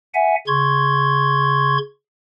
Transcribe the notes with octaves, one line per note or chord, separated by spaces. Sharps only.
E5 F#5 G#5
C#3 C6 C#6 G#6